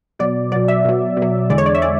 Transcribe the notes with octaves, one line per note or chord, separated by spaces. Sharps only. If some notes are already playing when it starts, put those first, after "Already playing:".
B2 F#3 D5
B2 F#3 D5
E5
B2 F#3
B2
F#3
E2 D3 G#3 D5
C#5
D5
E5
D3 G#3 D5